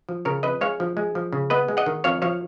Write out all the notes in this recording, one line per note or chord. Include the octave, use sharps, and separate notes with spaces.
F3
C#3 A#4 C#5
F2 B4 D#5
G#3 C#5 F5
F3
G#3
F3
C#3
B3 B4 D#5
G#3
D#5 F#5
D#3
F2 C#5 F5
F3 C#5 F5